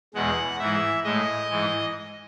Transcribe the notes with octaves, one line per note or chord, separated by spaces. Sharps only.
E2 B2 G#3 F#5
G#2 E3 G#3 E5
A2 G#3 D#5
G#2 E3 G#3